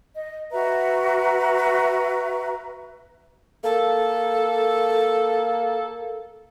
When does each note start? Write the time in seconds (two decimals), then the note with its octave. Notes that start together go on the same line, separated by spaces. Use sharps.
0.14 D#5
0.52 F#4 B4 E5 A#5
3.64 A#3 A4